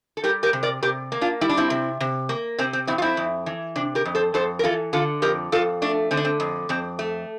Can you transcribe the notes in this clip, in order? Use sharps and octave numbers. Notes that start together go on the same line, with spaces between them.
A4
G3 G4 A#4
G4 A#4
C3
A#4 D5
C3 G4 A#4
A#3
D4 F4
G3 E4
D4
C4 E4
C3
C3
A#3
C3 C4
C4
F2 C4 E4
F4
C4 E4
F2
E3
C3 D4
G4 A#4
F2
A4 C5
F2 A4 C5
A#4
E3 F4 A4
D3 F4 A4
F2 G4 A#4
F2 F4 A4
A3 D4
D3 C4
D4
C4
F2
F2 C4
A3